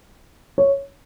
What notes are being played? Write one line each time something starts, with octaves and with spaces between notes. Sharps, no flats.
C#5